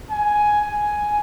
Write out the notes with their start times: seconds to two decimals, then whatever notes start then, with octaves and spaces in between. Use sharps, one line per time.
0.10 G#5
0.62 G#5